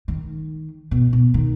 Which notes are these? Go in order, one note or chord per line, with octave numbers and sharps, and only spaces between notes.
D#3
B2
B2
D#3